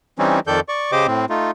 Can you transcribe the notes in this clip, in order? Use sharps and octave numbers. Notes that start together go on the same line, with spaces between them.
E3 G3 C4 C#4 D#4
F2 D#3 A4 D5 G6
D5 C#6
C#3 G4 C5 D#5 D6
A2 C4
A3 D#4 F4